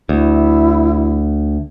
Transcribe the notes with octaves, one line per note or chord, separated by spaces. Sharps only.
D2 E4